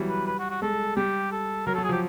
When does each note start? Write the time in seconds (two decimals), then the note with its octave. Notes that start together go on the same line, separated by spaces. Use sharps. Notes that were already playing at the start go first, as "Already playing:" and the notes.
Already playing: E3 F#3 G3
0.10 B4
0.27 B4
0.39 F#4
0.50 F#4
0.62 G#3 A4
0.97 G3 G4
1.32 A4
1.67 F#3 A#4
1.75 A4
1.78 F#3
1.84 G#4
1.89 F3
1.92 G4